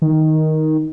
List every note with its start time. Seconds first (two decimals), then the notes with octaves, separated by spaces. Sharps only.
0.02 D#3